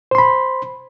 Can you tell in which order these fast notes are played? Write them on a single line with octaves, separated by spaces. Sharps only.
C5 C6 B5